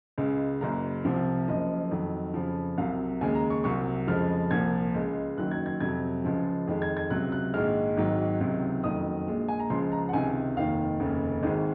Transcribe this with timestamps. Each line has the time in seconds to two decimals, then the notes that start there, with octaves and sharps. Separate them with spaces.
0.18 C#2 C#3 G#3
0.61 F#1 F#2 C#3 A#5
1.05 C2 C3 F3
1.48 F#1 F#2 F3 D#5
1.91 F2 D#3 F#3
2.34 F2 C#3 F3
2.78 C2 C3 F#3 F5
3.21 D#2 C#3 G#3 G#5
3.35 A#5
3.50 C#6
3.64 C2 C3 F#3 C#6
4.07 F2 C#3 F3 G#3 F6
4.51 C2 A#2 F3 G#6
4.94 C#2 C#3 G#3
5.37 F#1 F#2 D#3 F#3 F#6
5.51 G#6
5.66 G#6
5.80 F2 C3 F#3 G#6
6.24 C#2 C#3 F3 G#3
6.67 F2 D#3 G#3
6.82 G#6
6.97 G#6
7.10 C#2 C3 F#3 F#6
7.32 F#6
7.54 A#1 G#2 D#3 G#3 F6
7.97 G#1 G#2 D#3 F#3
8.40 C#2 C3 D#3 F#3
8.83 F#1 F2 D#3 F#3 D#6
9.27 A#1 A#2 G#3
9.48 G#5
9.60 A#5
9.70 C#2 C#3 F3 G#3 C6
9.92 A#5
10.09 F#5
10.13 C#2 C3 D#3 G#5
10.57 F1 D#2 D#3 F5
11.00 F1 D#2 C#3
11.43 G#1 G#2 D#3 G#3 D#5